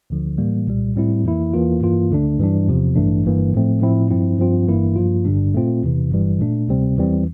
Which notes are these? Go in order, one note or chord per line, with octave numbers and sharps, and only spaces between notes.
D2 D3 F3
A2 E3 G3 A#3
C2 A#2 G3
A2 G3 C4 E4
F2 E3 A#3 E4
E2 E3 A#3 F4
G2 E3 A#3 F4
D2 D3 A3 D4
G2 E3 G3 D4
E2 C3 F3
A1 G2 E3 A3 D4
G1 G2 E3 A#3
A2 F3 A3 C4
A2 F3 C4 E4
G2 F3 C4 E4
G2 F3 C4 F4
G1 G2 E3 A#3 E4
G2 F3 A#3 F4
G1 G2 D3 G3 D4
A#2 A3 C4 F4
E2 C3 E3
G1 G2 E3 G3
A#2 A3 D4
D2 C3 G3 C4
E2 E3 G3 C4